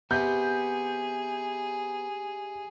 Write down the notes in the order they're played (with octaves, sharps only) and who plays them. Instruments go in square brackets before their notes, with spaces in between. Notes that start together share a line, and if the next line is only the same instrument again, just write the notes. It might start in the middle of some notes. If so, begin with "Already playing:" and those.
[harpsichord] C3 [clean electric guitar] B3 [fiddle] G#4 [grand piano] G6